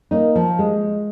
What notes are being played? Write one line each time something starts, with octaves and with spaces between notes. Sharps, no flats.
A#3 D#4
F3
G#3